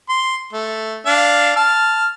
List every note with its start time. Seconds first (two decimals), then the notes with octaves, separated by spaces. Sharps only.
0.09 C6
0.53 A3
1.06 D4 F5
1.56 A5 F6